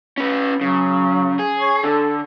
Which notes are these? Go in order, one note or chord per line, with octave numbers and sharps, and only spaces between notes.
C#4 B4
C#3 F#3
G#4
C#5
D3 A4